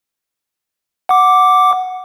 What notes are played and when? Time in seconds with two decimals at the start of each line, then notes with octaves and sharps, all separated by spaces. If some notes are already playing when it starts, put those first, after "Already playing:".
1.09 F#5 D6